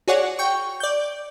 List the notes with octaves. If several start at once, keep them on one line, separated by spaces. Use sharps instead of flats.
F#4 G#4 C#5 D5 F#5
G5 C#6
D5 G6